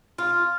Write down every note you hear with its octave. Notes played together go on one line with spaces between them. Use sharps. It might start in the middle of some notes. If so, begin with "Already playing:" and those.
F4